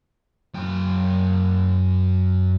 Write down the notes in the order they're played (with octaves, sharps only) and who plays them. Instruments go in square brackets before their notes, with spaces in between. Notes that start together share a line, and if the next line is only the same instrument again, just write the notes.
[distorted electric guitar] F#2 G5